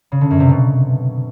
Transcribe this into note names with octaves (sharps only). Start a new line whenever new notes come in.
C#3
D3
F#2
C3
B2